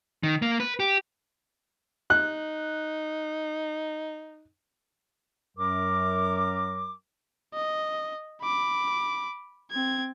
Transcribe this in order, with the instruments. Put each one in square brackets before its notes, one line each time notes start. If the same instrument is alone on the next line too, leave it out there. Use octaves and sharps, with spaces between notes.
[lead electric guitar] D#3
A#3
B4
G4
[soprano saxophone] D#4 [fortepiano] F#6
[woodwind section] F#2 F#3 A#4 D6
[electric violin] D#5
B5 D6
C4 G#6